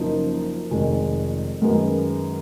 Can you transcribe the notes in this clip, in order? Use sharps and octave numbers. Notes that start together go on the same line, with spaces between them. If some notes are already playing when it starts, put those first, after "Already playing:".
Already playing: F#1 F#2 F3 A#3 D#4
F1 F2 D#3 G#3
F#2 D#3 G#3 B3